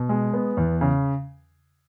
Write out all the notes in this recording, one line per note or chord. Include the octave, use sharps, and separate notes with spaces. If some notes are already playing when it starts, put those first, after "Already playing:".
Already playing: B2
G#3
B3
E2
C#3